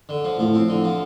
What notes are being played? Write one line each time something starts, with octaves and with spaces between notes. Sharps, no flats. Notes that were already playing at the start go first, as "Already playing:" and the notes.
D3
F3
A2 F3
C4
D3
F3